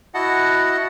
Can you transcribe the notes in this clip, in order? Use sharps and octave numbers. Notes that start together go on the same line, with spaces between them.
E4 F#4 D#5 F#5 A5